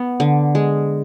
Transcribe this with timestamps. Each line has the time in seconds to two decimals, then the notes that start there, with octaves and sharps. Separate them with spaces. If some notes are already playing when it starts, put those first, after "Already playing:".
Already playing: B3
0.20 D3
0.55 G#3